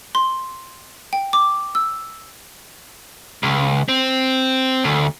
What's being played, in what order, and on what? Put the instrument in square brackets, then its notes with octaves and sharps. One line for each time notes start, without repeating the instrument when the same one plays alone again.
[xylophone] C6
G5
D6
E6
[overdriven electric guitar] C#2
C4
D2